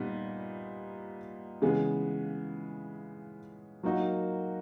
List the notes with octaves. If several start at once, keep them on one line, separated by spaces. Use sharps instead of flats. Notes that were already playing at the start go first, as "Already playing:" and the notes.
Already playing: A#2 G3 B3 D#4
C#3 E3 G#3 B3
F#3 A#3 D#4 F#4 A#4